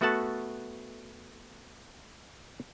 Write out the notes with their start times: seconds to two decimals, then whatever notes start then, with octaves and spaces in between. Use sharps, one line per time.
0.01 A3 B3 F#4 A4 F#5 A5